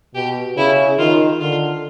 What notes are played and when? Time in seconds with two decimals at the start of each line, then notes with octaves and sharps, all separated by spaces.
0.15 B2 G4
0.56 C#3 E4
0.98 D#3 F4
1.40 D3 F4